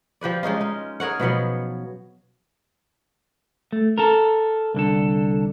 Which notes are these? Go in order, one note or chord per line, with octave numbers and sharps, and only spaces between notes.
F3 G4 B4 D5
G#3 C#4 D#4 F4
D#4
G#4 A#4 C#5 F#5
B2 F3 F#3 B3
A3
A4 A#4
C2 D3 A4